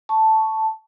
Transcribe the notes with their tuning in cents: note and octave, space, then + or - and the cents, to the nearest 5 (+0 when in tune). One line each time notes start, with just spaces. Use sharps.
A5 +0 C#6 +0